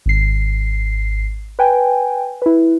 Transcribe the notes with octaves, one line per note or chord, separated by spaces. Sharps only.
G#1 C7
B4 G5 G#5
E4 B4